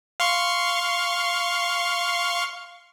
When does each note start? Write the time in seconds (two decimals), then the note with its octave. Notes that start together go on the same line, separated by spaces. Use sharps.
0.20 F5 C6 C#6